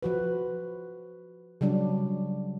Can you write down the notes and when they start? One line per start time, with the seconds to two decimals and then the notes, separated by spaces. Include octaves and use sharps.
0.03 F3 F#4 B4
1.61 C#3 F#3 G3 D4